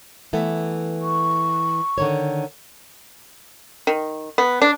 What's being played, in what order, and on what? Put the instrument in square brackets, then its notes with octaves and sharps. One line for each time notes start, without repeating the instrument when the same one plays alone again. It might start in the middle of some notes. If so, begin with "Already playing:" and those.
[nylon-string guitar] E3 A3 B3
[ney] C#6
[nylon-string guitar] D3 D#3 C#5
[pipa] D#3
B3
D4